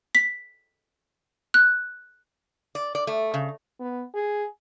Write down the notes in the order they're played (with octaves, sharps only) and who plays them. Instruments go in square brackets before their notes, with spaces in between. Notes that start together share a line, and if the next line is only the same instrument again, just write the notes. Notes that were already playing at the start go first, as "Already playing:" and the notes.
[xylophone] B6
F#6
[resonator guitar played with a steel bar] D5
D5
A3
C#3
[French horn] B3
G#4